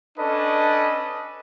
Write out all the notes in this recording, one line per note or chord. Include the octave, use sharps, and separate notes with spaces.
C#4 D4 A4 B4 D#5